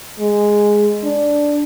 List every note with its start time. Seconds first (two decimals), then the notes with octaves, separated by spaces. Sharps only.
0.19 G#3
1.04 D4